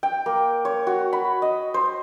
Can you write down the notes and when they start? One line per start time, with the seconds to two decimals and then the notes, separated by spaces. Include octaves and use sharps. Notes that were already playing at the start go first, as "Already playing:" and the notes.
0.03 G5
0.26 A#3
0.65 C#5
0.87 F#4
1.13 B5
1.42 D#5
1.74 C5